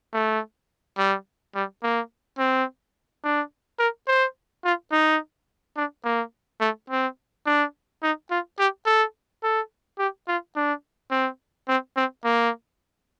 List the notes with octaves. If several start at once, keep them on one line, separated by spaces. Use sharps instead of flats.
A3
G3
G3
A#3
C4
D4
A#4
C5
F4
D#4
D4
A#3
A3
C4
D4
D#4
F4
G4
A4
A4
G4
F4
D4
C4
C4
C4
A#3